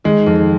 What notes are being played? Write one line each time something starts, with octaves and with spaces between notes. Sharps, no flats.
D#3 G#3
F2